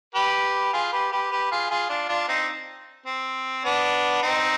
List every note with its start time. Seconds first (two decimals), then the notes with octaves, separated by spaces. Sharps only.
0.15 G4 B4
0.73 F4 G#4
0.92 G4 B4
1.12 G4 B4
1.31 G4 B4
1.52 F4 G#4
1.70 F4 G#4
1.89 D4 F4
2.09 D4 F4
2.28 C4 D#4
3.06 C4
3.65 B3 D4
4.23 C4 D#4